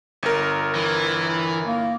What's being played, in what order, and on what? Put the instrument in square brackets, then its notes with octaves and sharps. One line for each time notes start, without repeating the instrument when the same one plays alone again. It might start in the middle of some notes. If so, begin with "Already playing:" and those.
[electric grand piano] G1 A#4
[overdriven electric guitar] E3
[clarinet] A#3